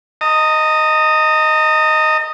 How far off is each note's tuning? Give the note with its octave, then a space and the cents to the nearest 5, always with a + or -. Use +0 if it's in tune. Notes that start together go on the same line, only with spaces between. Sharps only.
D#5 +0 A#5 -40